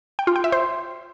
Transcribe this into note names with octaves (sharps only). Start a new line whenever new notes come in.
G5
F4
G5
E5
C5